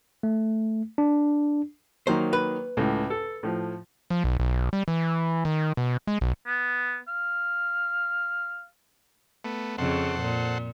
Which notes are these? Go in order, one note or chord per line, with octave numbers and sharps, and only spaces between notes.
A3
D4
D#3 F#3 A#3 C5
B4
C#2 A2
A4
A2 F3
F3
B1
B1
G3
E3
D#3
B2
G#3
B1
B3
F5
A3 B3
F2 C#3 A4 C5 F#5
A#2